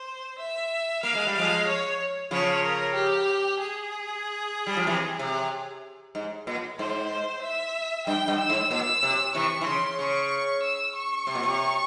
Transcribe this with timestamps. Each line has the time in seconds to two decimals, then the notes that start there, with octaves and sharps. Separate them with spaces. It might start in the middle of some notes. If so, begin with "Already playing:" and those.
Already playing: C5
0.39 E5
1.03 A#3 F5
1.15 G#3
1.27 G3
1.35 F3 G#3 F5
1.67 C#5
2.31 C#3 F3 C#5
2.63 A#4
2.95 G4
3.59 G#4
4.67 G3
4.77 F3
4.87 C3 E3
5.19 C3
6.15 G#2
6.47 A#2
6.79 G#2 C5
7.43 E5
8.07 G2 G5
8.28 G2
8.39 E6
8.49 G#2
8.71 A#2 E6
9.03 C3
9.35 C3 E3 C#6
9.61 E3
9.66 C#3 C6
9.99 C#3 C#6
10.62 E6
10.95 C#6
11.27 C3
11.35 A#2
11.43 C3